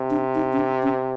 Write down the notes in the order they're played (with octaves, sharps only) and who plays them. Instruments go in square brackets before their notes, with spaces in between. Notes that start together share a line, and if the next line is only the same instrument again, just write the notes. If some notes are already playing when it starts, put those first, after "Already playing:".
Already playing: [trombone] C3
[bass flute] D4
D#4
C#4
D4
C#4